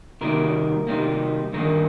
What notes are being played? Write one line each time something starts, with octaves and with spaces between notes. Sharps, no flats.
C3 D#3 G3 A#3 A#4
C3 D#3 G3 A#3
G2 D#3 A#3 A#4